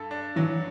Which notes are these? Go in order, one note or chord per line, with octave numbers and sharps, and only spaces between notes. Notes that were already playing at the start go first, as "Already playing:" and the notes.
Already playing: G2 A4
D4
E3 F#3